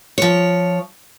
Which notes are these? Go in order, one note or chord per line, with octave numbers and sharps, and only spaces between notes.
F3 C#5